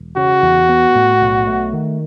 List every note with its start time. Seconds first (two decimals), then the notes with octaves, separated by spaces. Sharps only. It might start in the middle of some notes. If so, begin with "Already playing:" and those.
Already playing: E1
0.17 C#3 F#4
0.43 E2
0.69 B3
0.95 A2
1.21 B1
1.47 A3
1.73 D#3